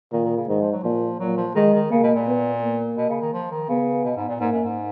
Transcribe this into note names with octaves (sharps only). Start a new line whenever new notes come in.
A#2 D#3
D#3
C#3
G#2 D#3
F3
F#3
A#2 F3
A#2 F#3
F3
D#3 G#3
D#3
C#3 A#3
B2
A#2
B3
A#3
B2
C#3
D#3
F3
D#3
C#3 B3
B2
G#2
A#2
G#2 A#3
F#2
G#2